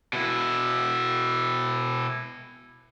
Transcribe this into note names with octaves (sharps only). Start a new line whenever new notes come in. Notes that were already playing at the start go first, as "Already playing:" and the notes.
B2 E4